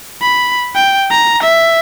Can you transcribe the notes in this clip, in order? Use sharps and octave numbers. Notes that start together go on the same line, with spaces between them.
B5
G5
A#5
E5